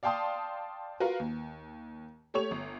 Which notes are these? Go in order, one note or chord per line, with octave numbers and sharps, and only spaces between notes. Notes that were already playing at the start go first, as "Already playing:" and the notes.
D5 F5 G5 A5 C6 D#6
F4 F#4 A#4 B4
D#2
A3 G4 C#5 C#6 F7
G1